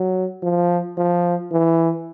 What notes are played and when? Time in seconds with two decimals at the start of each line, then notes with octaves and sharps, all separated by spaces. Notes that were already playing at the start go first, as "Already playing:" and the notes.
Already playing: F#3
0.43 F3
0.98 F3
1.52 E3